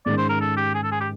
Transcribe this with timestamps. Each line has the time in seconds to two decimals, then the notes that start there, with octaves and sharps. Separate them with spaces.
0.06 G#2 D#3 G#3 C#4 D5
0.18 C5
0.29 A#4
0.41 A4
0.57 G4
0.74 G#4
0.83 A4
0.92 G#4
1.01 G4